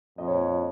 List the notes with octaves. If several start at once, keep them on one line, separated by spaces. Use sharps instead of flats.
F2 D#5
C#5
D#5
C#5